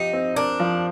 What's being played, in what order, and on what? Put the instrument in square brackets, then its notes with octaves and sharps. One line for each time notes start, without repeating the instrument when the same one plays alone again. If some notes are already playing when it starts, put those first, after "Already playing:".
Already playing: [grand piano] F3 C4 G4 [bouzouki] D#4
[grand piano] C4
[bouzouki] D4 [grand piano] A#4
[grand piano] F3